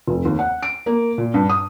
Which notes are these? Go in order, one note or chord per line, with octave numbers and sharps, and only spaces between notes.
F1
D#2
F#5
D7
A#3
A#2
G2
D#6